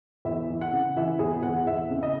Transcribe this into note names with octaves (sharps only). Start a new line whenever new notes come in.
E2 E5
E3
F#5
C#3
E3 E5
E2 G#4
E2 F#5
E2 E5
C#3
D#5